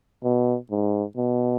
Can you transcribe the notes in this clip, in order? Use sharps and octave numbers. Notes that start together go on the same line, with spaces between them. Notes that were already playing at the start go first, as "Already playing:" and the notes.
B2
G#2
B2